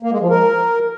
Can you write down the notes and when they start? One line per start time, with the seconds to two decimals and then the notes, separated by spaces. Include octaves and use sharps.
0.03 A#3
0.12 G#3
0.21 F3
0.30 A#4